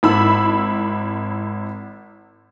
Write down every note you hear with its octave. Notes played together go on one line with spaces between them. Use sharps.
G#1 E4 B5 E6